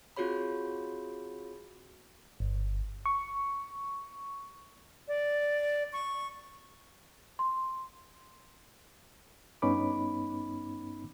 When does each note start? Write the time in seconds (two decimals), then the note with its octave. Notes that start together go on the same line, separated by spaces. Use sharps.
0.17 C4 F4 F#4 G#4 C#5 B5
2.40 G1
3.06 C#6
5.08 D5
5.93 C#6
7.39 C6
9.62 G2 B3 C#4 D#4 B5 D6